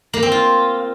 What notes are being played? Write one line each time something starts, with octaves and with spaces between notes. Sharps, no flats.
A#3
C4
F4